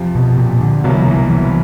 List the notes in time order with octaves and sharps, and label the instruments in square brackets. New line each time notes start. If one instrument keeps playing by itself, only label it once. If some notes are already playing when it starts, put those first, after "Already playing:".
Already playing: [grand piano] F2 C3 F3
[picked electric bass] B2
A#2
D3
[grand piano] C2 B2 F#3 A#3 [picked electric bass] D3
[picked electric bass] F3
E3
E3